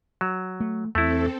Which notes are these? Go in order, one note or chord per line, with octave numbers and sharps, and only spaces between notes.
F#3
A3
E2 A3 C4 E4 A4